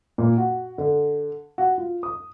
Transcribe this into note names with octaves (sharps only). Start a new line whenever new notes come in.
A#2
F#4
D3
F#4
F4
D#6